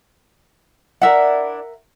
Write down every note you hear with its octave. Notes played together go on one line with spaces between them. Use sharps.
D4 E4 A#4 E5 F#5